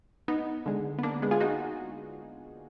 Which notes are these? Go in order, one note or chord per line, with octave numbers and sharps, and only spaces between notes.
B3 D#4
D3 G#3
B3
A#3 D4
G#3 B3
F4 G#4
D#4 F#4